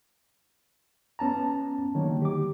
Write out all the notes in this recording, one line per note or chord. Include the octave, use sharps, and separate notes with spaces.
B3 C#4 A5 A#5
D3 D#3 F#3 G3 A#3 C#5
G4 D6